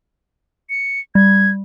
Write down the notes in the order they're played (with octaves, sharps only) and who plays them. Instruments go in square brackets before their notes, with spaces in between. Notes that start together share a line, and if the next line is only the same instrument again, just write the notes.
[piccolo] C#7
[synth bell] G3 [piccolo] G#6